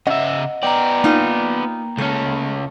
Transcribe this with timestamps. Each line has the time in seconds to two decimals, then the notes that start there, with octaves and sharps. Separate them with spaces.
0.07 C#3 D#5 E5 F#5
0.63 B3 D5 G5 A#5
1.04 A#3 D#4 F4
1.98 C#2 A3 C#4